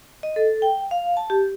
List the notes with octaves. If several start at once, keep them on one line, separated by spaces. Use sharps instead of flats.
D#5
A4
G5
F5
A5
G4